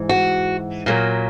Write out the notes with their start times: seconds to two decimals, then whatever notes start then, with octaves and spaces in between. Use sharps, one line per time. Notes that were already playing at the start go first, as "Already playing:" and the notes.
Already playing: G#2 E3
0.09 F#4
0.86 A#2 F#3 A#3